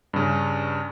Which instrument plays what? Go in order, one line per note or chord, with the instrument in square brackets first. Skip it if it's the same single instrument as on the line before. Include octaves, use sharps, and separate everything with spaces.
[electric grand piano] G2 C#3